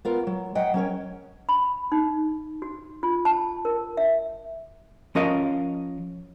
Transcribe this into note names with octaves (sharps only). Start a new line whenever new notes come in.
B3 F4 A#4
F#3
F#3 D#5 F#5 G5
F#3 C#4 A#4 C#5
B5
D#4
F#4
F4
A5
A#4
E5
F3 C#4 A#4 D#5 F5